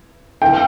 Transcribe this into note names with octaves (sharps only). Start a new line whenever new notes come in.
G5